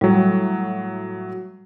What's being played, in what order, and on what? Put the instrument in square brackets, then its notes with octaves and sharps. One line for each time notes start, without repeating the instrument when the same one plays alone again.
[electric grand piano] A2 F#3 [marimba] G3